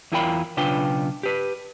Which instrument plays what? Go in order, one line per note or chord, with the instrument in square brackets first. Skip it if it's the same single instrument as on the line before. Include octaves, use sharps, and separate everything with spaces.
[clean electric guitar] E2 E4 F4 A#4 G5 B5
B1 C#3 D4 F4 B4 G5
G4 B4